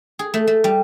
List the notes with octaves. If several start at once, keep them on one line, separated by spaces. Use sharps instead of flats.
G#4
A3
A3
G3